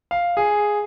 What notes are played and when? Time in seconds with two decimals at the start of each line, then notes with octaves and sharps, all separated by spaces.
0.11 F5
0.37 G#4